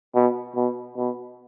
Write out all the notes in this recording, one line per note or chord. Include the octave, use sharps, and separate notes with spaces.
B2
B2
B2